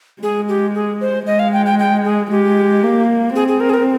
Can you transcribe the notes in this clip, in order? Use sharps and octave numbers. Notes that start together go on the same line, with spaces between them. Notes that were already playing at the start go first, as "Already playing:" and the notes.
G#3 G#4
G4
G#4
C5
G#3 D#5
F5
G5
G5
G5
G#4
G#3 G4
A#3
C4 G#4
G#4
A#4
G#4
A#4